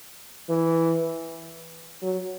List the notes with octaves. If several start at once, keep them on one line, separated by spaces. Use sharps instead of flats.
E3
F#3